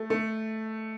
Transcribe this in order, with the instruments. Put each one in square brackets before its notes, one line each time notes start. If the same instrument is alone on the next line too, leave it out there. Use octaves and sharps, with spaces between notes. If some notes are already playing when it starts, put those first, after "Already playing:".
Already playing: [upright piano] A3
A3